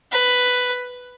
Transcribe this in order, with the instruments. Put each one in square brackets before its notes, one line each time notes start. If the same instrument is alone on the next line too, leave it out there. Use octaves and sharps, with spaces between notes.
[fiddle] B4